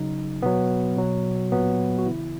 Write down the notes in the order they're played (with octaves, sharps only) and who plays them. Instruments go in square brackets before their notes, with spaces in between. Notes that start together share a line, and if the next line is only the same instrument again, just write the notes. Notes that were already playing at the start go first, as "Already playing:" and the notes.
Already playing: [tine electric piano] C#3 F#3 D#4
B2 F#3 B3
B2 F#3
A#2 F#3 B3
F#4
C#3 E3 E4